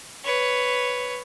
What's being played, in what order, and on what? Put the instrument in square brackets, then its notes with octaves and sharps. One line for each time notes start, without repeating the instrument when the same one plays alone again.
[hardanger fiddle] B4 C#5